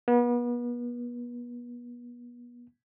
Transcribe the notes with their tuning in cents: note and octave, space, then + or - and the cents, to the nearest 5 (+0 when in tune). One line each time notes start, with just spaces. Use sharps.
B3 -35